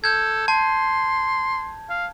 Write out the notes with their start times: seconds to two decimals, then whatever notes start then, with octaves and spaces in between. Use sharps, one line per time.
0.04 A4 G6 G#6
0.48 A5 C6
1.90 F5